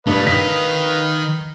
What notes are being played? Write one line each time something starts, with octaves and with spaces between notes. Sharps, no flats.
G2 A#2 A3 B4 D#5 F5
D#3 D#4 B6